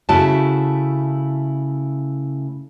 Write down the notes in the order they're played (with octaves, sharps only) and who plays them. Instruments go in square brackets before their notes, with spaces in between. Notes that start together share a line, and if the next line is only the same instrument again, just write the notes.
[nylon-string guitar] C#3 A3 E4 F#4 A5